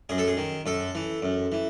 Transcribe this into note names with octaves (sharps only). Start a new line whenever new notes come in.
F#2 G#4
A4
G#4
D#3
F#2 A4
E3
F#2
E3